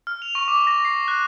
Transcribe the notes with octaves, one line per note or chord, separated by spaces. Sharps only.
F6
F7
C#6
D6
A#6
C7
F#6